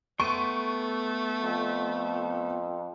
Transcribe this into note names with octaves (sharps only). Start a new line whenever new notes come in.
A3 B3 G5 C6 C#6 D#7
F2